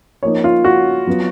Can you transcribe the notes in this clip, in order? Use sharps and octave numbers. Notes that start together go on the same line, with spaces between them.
F3 A#3 D#4 C#5
F4
F#4
F#3 B3 F4